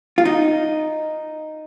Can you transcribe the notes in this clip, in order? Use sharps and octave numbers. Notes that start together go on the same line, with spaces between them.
F4
D#4